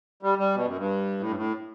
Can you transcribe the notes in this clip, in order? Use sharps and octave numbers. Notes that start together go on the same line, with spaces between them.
G3
G3
B2
F#2
G2
A2
G2
A2